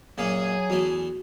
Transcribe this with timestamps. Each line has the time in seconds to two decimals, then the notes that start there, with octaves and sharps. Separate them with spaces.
0.18 F#2 A#2 F#3 A#3 G#4 G#5
0.70 E2 E3 A3 F#4